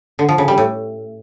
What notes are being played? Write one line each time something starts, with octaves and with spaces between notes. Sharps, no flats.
D3
F3
C#3
G3
A2